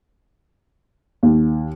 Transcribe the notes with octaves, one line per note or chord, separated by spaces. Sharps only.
D#2